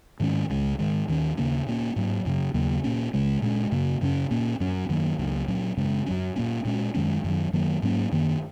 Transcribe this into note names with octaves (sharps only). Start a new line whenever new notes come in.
G#2 D#3 G#3 C#4
C#2 C#3 G#3
G#2 D#3 G#3
D#2 D#3 F#3 C#4
D#2 C#3 A#3 C#4
A#2 A#3 C#4
G#2 F#3 A#3
F#2 C#3 F#3
D#2 C#3 F#3 A#3
A#2 A#3 C#4
C#2 C#3 G#3
A#2 G#3 C#4
F#2 C#3 A#3
F#2 C#3 A#3 C#4
A#2 A#3 C#4
F#2 F#3 C#4
F#2 D#3 F#3 A#3
C#2 C#3 F#3 A#3
A#2 F#3 C#4
F#2 C#3 G#3 C#4
F#2 F#3 C#4
A#2 A#3 C#4
A#2 G#3 C#4
F#2 D#3 G#3 C#4
F#2 D#3 F#3
F#2 D#3 F#3 A#3
G#2 F#3 A#3 C#4
F#2 D#3 A#3